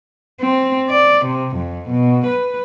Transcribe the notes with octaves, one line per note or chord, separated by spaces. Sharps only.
C4
D5
C3
F2
B2
B4